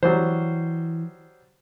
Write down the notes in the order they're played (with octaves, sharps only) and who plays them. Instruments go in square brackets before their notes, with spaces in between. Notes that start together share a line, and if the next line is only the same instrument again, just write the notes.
[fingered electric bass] E3 [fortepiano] F#3 G3 C5